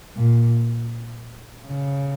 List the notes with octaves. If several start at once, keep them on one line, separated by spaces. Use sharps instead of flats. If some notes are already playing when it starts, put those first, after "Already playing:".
A#2
C#3